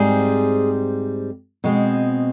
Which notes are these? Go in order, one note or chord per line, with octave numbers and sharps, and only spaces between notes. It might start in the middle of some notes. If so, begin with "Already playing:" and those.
Already playing: G#2 G3 C4 G#4
B2 G#3 C4